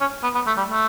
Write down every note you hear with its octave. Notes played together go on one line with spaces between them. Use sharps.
C#4
B3
B3
A3
G3
A3